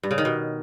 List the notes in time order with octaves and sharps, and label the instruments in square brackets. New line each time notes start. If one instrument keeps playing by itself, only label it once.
[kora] G2
C#3
D#3
B2